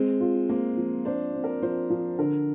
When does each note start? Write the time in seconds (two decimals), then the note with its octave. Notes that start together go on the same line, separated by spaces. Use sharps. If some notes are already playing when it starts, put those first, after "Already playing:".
Already playing: G#3 C4
0.21 F4
0.49 A#3 C4
0.77 F3
1.05 D4 C5
1.34 C4
1.44 A#4
1.62 F3 C5
1.90 F3
2.18 D3 A#4